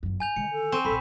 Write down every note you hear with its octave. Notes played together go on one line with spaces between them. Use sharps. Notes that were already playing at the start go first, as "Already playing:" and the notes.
G1 F#2
D4 G#5 G6 F7
D3 D#3 G#3 C#7
A4
C4 C#6 D#7 E7
E1 A#1 A4 B5 B6